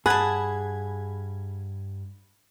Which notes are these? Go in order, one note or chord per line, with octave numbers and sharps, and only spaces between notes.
G2 G#4 F#5 A5 B5 G#6